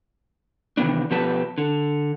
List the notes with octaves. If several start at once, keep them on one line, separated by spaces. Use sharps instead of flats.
C3 D#3 E3 B3 D4
B2 F3 B3 G4 B4 A5
D3